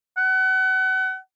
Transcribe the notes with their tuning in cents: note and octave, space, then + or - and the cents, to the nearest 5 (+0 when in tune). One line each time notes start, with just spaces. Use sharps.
F#5 +30